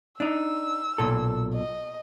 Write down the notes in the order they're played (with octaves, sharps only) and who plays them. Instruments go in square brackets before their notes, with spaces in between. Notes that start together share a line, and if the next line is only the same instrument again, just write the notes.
[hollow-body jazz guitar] D4 D#4 [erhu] E6
[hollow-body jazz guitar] B1 A#2 A4
[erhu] D#5